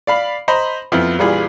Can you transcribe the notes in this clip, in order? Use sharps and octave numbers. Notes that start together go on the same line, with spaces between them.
D5 F5 B5
C5 D#5 A#5 B5
F2 F3 B3 E4
A#1 E3 G3 F4 G#4 B5